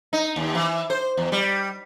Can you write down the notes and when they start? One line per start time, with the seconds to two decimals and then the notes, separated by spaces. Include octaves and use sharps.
0.13 D#4
0.36 D#2
0.55 E3
0.90 C5
1.17 E2
1.32 G3